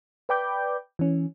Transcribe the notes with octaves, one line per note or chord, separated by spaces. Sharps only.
B4 D5 G5 B5 D6 G6
E3 C#4